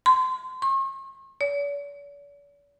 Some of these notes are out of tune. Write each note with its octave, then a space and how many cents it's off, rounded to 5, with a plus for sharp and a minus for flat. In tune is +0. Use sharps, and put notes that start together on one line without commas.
C6 -30
C#6 -45
D5 -45